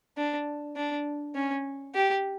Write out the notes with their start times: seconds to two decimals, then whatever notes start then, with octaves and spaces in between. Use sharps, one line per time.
0.17 D4
0.76 D4
1.35 C#4
1.95 G4